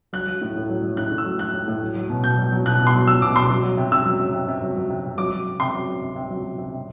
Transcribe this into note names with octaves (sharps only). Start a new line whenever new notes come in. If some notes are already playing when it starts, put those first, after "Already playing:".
F#3 F#6
F#3
A2
A2
F#3
F#3
A2 F#6
A2
E6
F#3
F#3 F#6
A2
A2
F#3
F#3
B2
B2 G6
F#3
F#3
B2 F#6
B2
C6
F#3
F#3 E6
B2 D6
B2 C6
F#3
F#3
C3
C3 E6
F#3
F#3
C3
C3
F#3
F#3
C3
C3
F#3 D6
F#3
C3
C3 C6
F#3
F#3
C3
C3
F#3
F#3
C3
C3